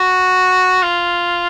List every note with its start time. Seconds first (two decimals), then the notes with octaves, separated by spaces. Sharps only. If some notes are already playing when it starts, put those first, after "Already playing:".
Already playing: F#4
0.83 F4